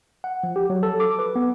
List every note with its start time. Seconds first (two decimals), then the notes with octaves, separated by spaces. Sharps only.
0.24 F#5
0.44 F3
0.56 G4
0.70 F#3
0.83 A4
1.00 D6
1.19 B4
1.36 B3